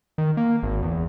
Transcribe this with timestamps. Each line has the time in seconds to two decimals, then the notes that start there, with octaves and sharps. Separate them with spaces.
0.18 D#3
0.37 A#3
0.63 G#1
0.83 E2